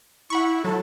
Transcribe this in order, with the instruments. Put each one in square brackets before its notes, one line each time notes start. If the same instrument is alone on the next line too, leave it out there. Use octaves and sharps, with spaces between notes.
[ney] E4 [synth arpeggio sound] F#5 B5 C#6
[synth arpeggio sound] F#3 [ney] A4